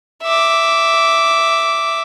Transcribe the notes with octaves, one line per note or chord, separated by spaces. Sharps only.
E5 D6